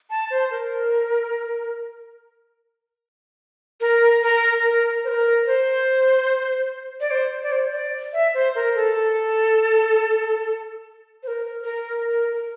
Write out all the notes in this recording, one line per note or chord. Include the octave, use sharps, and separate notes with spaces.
A5
C5
A#4
A#4
A#4
A#4
C5
A#4
C5
D5
C5
D5
C5
D5
E5
C5
A#4
A4
C5
A#4
A#4
A#4
A#4